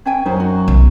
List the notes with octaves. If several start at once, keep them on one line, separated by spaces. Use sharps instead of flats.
C#4 G5 G#5
F#2 C#4 D#4 C5
F#4
B1